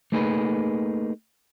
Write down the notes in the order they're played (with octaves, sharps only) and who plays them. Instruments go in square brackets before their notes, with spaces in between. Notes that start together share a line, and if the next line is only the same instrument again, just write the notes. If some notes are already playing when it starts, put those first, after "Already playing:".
[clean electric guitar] A3 A#3 D#4 G#4 B4